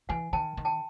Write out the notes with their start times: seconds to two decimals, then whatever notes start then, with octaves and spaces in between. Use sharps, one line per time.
0.09 E3 F#5 G#5
0.33 D#3 G5 A5
0.57 D#3
0.65 G5 A5